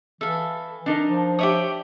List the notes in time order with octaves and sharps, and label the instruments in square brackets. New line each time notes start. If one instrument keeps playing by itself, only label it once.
[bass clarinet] E3 [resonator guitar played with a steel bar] A4 [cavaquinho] E5 F5
[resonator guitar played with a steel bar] D4 D#4 A#4
[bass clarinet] F3
[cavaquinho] G4 E5 D#6 [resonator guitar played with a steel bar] C#5 D5